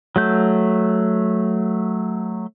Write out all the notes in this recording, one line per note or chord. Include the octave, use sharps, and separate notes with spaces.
F#3 A3 G6